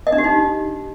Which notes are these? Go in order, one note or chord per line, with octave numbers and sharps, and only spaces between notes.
D#5
D4
G4
D#4